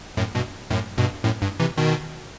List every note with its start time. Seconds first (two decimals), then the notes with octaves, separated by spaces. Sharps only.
0.17 F#2 A2
0.35 G2 B2
0.70 F#2 A2
0.98 G2 B2
1.24 F#2 A2
1.42 G2
1.60 C3 E3
1.77 B2 D#3